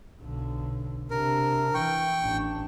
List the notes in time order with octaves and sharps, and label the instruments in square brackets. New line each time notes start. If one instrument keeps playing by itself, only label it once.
[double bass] B1 D3
[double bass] C3 D4 [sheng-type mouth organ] A#4
[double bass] E3 [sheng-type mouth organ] G5 C#6
[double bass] A1 D4